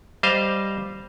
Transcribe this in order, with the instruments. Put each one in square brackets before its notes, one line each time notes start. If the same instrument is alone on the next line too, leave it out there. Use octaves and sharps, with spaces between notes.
[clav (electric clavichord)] G3 C5 D#5 F5